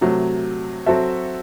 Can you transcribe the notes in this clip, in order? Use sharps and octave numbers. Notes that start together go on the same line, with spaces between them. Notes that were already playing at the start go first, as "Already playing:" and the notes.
C3 F#3 A3
F#3 C4 F#4 A4 E5